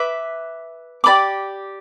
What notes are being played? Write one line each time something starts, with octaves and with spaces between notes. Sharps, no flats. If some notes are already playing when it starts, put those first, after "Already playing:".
Already playing: B4 E5 D6
G4 D5 B5 D6